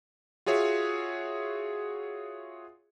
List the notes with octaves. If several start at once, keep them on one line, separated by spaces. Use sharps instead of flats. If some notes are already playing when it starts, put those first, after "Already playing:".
F4 F#4 G#4 C#5 E5